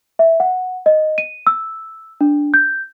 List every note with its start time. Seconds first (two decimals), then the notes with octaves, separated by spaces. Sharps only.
0.19 E5
0.40 F#5
0.86 D#5
1.18 D#7
1.47 E6
2.21 D4
2.54 G6